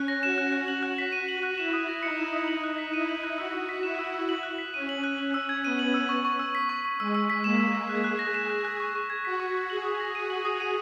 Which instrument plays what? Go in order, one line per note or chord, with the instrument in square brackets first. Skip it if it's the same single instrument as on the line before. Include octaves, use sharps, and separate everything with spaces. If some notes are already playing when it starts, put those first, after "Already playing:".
Already playing: [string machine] C#4 [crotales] F#6
[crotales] A#6
[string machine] F#4 [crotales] E7
[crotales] F#6
F#6
[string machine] F#4 [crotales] F#7
[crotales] F#6
B6
D#7
F#7
F#6
[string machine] E4 [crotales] E7
[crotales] D#6
A#6
[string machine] D#4 [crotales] C#7
[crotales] E7
D#6
[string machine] D#4 [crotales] F#7
[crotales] F#6
B6
[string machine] E4 [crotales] D#7
[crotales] F#7
F#6
[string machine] F#4 [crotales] E6
[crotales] E6
B6
[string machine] E4 [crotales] E7
[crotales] E6
E6
F#7
F#6
B6
[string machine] C#4 [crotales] D#7
[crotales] F#7
F#6
F#7
E6
G#6
[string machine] B3 [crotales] D#7
[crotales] F#7
E6
C#6
C#6
E6
B6
C#6
C#6
[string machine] G#3 [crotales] E6
[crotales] E6
B6
[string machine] A#3 [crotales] E7
[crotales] E6
E6
[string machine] G#4 [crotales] F#6
[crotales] F#6
A#6
E7
F#6
F#6
C#6
C#6
G#6
[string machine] F#4 [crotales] B6
[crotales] C#6
C#6
[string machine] G#4 [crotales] F#7
[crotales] D#6
A#6
[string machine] F#4 [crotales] D#7
[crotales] F#7
D#6
D#7